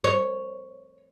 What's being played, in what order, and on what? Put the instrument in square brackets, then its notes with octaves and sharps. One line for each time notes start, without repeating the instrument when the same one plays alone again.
[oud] C#5